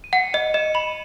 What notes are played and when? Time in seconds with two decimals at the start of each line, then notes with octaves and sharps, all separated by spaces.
0.04 D#7
0.13 F#5 C#7
0.33 D#5 D#7
0.54 D#5 E7
0.74 B5 F#7